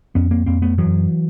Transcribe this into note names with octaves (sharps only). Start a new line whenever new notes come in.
F2 B3 C#4
A#3 C4
F2 A#3 C4
A3 B3
F#2 E3 F#3